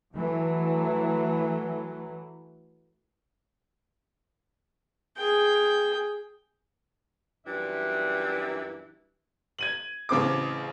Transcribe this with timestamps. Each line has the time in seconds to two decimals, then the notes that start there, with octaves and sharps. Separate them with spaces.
0.13 E3 F#3 A3
5.17 G#4 G5
7.46 F#2 A#2 E3 G3 D4 E5
9.59 G#6 D#7 F#7
10.09 A1 C#3 C4 D6